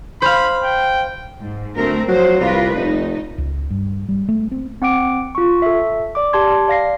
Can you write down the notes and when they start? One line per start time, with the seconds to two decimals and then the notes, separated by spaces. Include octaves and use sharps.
0.22 C5 F5 B5
0.63 G5
1.40 G#2
1.76 D2 A3 C4 A#4
2.08 F3 F#3 C5
2.41 C2 F4 A#4 B4
2.76 F1 A3 D#4
3.38 C#2
3.71 G2
4.09 G3
4.29 A3
4.51 C4
4.82 C4 F#5 D6 D7
5.35 F4 C#6
5.62 A4 E5
6.15 D5 D6
6.33 G4 A5 C6 G#6
6.68 D5 F5 A#6 C7